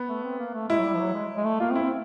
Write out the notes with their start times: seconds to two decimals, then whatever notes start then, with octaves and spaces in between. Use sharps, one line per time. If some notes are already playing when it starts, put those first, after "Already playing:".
Already playing: B3
0.09 A3
0.24 C4
0.39 A#3
0.54 A3
0.69 G#3 E4
0.79 F#3
0.85 G3
0.94 F3
0.99 F#3
1.14 G#3
1.37 G#3
1.45 A3
1.60 A#3 F4
1.71 C4
1.76 E4
1.83 C4